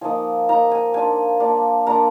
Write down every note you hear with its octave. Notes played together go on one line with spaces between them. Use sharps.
F3 A#3 D#4 G#5
F3 A#3 D#4 A#5
G#5
A#3 D4 F4 G#5
A#3 D4 F4
A#3 D4 F4 A#5